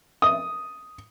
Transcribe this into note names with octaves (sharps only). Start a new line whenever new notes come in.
D#6